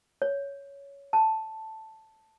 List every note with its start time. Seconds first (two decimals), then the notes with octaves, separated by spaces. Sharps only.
0.22 C#5
1.13 A5